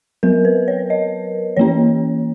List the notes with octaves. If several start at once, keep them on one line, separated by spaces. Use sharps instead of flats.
F#3 B3 A#4
B4
C#5
D#5
E3 A#3 C#4 C#5